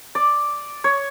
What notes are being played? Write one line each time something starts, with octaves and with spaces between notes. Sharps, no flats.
D5
C#5